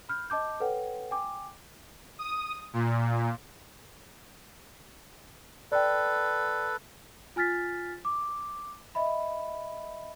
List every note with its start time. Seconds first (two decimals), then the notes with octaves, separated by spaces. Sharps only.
0.09 B5 F6 G6
0.30 D#5 A5 D6 G6
0.60 A4 B4 C#5 F#5 G5
1.11 G5 G#5 D6
2.19 D#6
2.73 A#2
5.72 A4 B4 D5 G5
7.36 F4 G#5 F6 A6 B6
8.05 D6
8.95 D#5 E5 B5